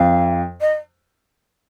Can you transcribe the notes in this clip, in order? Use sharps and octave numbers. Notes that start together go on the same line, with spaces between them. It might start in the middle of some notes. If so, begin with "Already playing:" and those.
Already playing: F2 F5
D#5